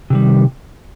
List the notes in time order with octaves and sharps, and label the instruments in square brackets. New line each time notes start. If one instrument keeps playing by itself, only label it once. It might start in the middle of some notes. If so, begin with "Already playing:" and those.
[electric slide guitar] C3 D#3 G3